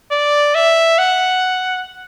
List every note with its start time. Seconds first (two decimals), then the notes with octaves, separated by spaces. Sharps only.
0.12 D5
0.55 E5
0.99 F#5